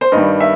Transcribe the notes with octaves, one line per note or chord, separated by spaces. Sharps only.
C5
G2 D#3 G3 D#5
E5